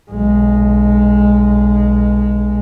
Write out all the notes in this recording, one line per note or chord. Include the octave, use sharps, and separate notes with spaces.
B1 G#3